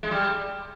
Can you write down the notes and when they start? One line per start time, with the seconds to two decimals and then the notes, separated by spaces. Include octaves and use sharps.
0.03 G#3
0.11 G3